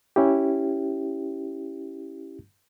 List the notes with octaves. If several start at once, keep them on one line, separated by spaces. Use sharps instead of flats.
C#4 E4 G4